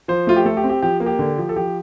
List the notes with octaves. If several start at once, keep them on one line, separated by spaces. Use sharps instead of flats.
F3 C5
A3 F4
G4
A3 A4
G4
C4
G4
F3 G4
A#3
G4
D3
F3
A4
F3 G4